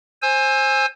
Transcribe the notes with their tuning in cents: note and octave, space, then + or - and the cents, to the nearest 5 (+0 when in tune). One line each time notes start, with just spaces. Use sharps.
C5 +20 G#5 +0 E6 +0